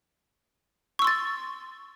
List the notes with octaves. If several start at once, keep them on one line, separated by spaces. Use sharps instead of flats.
C6 C#6 E6 A6